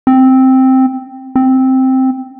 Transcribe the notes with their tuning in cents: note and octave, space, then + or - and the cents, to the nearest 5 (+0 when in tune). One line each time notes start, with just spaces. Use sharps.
C4 +0
C4 +0